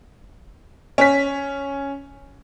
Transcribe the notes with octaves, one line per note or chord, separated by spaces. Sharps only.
C#4 B6